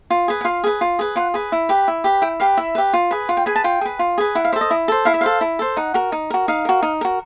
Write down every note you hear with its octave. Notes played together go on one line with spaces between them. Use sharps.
F4
G#4 B4
F#5
F4 F5
G#4 B4
F4
G#4 B4
F4 F#5
G#4 B4
E4
G4 B4
E4
G4 B4
E4 G5
G4 B4 F5
E4 E5
G4 B4
F4
G#4 B4
F4 F#5
G5
G#4 B4 G#5
A5
F4 G5
G#4 B4
F4
G#4 B4
E4 F#5
F5
A4 C5 E5
D#5
E4
A4 C5
E4 F5
E5
A4 C5 F5
E4
A4 C5
D#4 F#5
F#4 A#4
D#4
F#4 A#4
D#4 F5
F#4 A#4
D#4
F#4 A#4